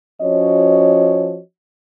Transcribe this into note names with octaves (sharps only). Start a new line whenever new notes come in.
F3 C#4 F#4 C#5 D#5